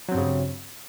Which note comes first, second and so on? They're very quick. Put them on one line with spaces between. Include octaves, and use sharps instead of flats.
F#3 C4 G2 C#3